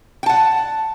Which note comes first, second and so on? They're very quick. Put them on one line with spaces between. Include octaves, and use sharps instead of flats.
G5 A5 F#5